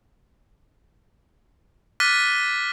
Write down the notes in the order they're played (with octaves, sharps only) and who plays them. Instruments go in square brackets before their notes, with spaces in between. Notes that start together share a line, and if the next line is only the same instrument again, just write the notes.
[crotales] D6 F6 F#6 A6 B6 D#7